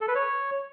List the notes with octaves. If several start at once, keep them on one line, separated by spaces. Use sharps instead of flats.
A4
B4
C#5